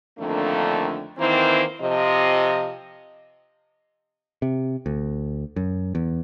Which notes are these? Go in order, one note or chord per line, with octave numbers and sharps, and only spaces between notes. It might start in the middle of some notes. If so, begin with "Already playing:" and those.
F2 D3 D#3 A3 A#3 D4
D#3 E3 A#3 C4 E4 C5
C3 F3 D#5
C3
D2
F#2
E2